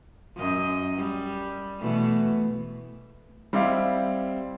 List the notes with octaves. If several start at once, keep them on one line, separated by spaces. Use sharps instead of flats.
F#2 D#5
G3
B2 E3 A3
G3 C4 E4 G4 D#5 F5